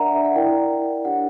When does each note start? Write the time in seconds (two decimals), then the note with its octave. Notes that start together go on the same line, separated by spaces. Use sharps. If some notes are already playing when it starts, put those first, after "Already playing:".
Already playing: D4 A#4 D5 E5 F#5 A#5
0.15 E5
0.25 F#5
0.35 E4 A#4 D5 G5
1.05 D4 G4 C#5 F#5